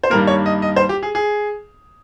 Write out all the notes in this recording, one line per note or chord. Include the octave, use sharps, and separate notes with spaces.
C5
G2 D#3 G3 A#3 A#4
C#5
D#5
D#5
C5
G4
G#4
G#4